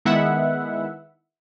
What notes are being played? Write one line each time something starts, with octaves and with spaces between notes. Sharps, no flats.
D#3 G#3 B3 E4 E5 F#5